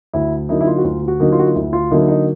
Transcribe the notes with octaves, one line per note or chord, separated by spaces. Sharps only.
D2 E4
D3 F#3 A#3 D#4 E4
E4
F4
F#4
D2 F4
F4
F#4
D3 F#3 A#3 D#4
F4
F#4
F4
D2 E4
F4
D3 F#3 A#3 D#4 E4
D#4